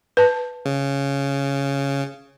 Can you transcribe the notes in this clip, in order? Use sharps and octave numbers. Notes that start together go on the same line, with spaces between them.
B4 A5
C#3